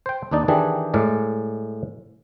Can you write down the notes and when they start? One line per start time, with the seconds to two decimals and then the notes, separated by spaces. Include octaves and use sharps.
0.06 C5 G5
0.31 D#2 D4 D#4 D5
0.48 D#3 E3 D4 G4 G#4
0.94 A2 G#3 A#4 D5